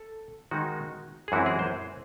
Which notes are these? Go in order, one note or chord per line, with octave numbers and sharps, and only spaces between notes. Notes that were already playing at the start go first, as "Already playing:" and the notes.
Already playing: A4
D#3 G#3 D#4 F#4
G#4
F#2 E3 G#3 C4 E4 F#4
G#4
C5